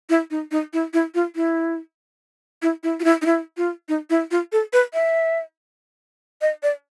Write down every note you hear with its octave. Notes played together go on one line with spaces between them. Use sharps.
E4
D#4
D#4
E4
E4
F4
E4
E4
E4
F4
E4
D#4
E4
F4
D#4
E4
F4
A4
B4
E5
D#5
D5